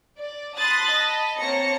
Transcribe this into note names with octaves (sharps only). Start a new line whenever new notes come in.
D5
A5 B5 C6 D#6 F#6 A6
D#5 A5 B5
A#3 C4 C#5 A5 A#6 C#7